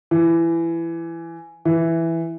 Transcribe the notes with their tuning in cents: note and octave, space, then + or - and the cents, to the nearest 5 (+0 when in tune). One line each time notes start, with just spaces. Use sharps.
E3 +20
E3 +5